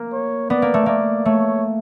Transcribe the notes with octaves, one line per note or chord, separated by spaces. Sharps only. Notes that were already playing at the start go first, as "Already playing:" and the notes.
Already playing: A#3
C#5
B3 D5
A#3
A3
A#3 D5
A3 C#5